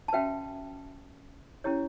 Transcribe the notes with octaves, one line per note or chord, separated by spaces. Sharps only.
A5
C#4 F#4 B4 E5 G5
C#4 E4 G4 C#5